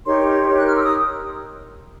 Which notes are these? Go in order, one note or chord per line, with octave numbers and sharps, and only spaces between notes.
D#4 G4 A#4 C#5 C6
D#4 G4 A#4 C#5
F#6
F6
E6
D#6